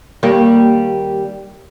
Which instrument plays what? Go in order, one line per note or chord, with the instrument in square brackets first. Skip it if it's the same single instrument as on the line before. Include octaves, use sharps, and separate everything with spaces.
[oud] D#2 G3 A#3